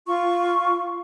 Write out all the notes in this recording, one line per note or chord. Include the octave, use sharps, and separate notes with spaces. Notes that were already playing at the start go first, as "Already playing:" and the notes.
F4 C#6